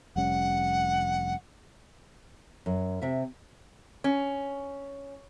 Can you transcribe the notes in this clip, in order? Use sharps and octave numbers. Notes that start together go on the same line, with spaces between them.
F1 G3 C#4 F#5
F#2
C3 E5
C#4